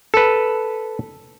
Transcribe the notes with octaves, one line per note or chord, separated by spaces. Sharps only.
A4 B4